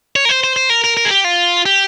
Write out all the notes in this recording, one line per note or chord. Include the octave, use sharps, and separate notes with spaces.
C#5
A#4
C5
C5
C5
A#4
A#4
A#4
G#4
G4
F4
G4